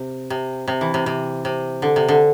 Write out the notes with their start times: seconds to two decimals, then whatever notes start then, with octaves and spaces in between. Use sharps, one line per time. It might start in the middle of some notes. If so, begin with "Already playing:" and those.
Already playing: C3
0.30 C3
0.68 C3
0.81 E3
0.94 C3
1.06 C3
1.45 C3
1.82 D3
1.96 C3
2.08 D3